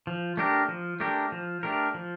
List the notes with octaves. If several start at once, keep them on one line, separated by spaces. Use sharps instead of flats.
F3
A3 D4 G4 A#4
F3
A3 D4 G4 A#4
F3
A3 D4 G4 A#4
F3